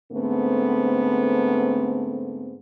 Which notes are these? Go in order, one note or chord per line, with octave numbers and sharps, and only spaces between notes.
G#2 D3 A3 B3 C4